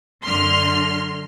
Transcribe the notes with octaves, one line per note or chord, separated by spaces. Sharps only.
F#2 D3 C6 F6